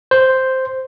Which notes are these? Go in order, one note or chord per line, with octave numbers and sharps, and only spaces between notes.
C5